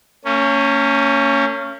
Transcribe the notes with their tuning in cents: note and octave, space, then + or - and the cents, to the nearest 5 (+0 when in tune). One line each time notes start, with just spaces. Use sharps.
A#3 -45 C#4 +0